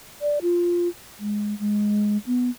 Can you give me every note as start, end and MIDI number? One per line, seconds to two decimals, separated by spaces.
0.22 0.39 74
0.42 0.89 65
1.19 1.58 56
1.59 2.18 56
2.26 2.50 59